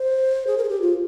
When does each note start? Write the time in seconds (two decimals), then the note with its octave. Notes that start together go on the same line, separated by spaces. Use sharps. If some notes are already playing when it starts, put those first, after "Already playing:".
Already playing: C5
0.47 G#4
0.58 A#4
0.64 G#4
0.69 G4
0.81 F4